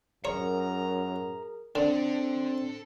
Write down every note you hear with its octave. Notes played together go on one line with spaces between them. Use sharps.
F#2 G#4 A#4 C#5 A#5
D3 C4 D4 A4 D5